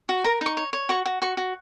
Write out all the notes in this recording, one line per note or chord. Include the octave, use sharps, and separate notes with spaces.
F#4
A#4 A#5
D#4 C#6
C#5
C#5
F#4 C#6
F#4
F#4 C#6
F#4